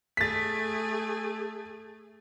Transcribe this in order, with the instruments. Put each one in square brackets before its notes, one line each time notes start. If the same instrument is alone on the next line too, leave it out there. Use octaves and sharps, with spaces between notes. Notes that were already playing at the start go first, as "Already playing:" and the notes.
[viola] A3 G#4 [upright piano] A6 B6